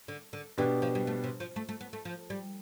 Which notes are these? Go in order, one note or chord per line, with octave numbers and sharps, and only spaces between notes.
D3
D3
B2 E3 B3 D4 G4
F3
G3
A3
C3
F3
A3
A3
B3
A3
F3
G3